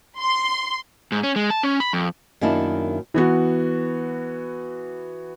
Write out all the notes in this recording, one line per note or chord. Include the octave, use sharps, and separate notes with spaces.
C6
G#2
C#4
G#3
A5
C#4
B5
F2
F#2 D#3 A#3 D4 E4
E3 B3 F#4